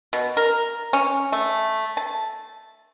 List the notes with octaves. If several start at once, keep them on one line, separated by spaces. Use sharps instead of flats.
B2
A#4
C#4
A3
A5